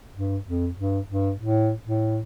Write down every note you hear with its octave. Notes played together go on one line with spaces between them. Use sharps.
G2
F2
G2
G2
A2
A2